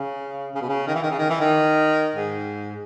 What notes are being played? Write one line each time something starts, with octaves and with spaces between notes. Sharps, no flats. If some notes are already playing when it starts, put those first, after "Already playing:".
Already playing: C#3
C#3
B2
C#3
D#3
E3
D#3
C#3
D#3
E3
D#3
G#2